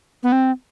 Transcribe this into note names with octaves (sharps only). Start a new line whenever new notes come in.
B3
C4